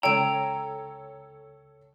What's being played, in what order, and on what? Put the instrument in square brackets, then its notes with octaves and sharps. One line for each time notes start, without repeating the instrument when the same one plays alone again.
[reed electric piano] C#2 E6 [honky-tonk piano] A4 C#5 [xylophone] G5 D7 [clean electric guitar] A#5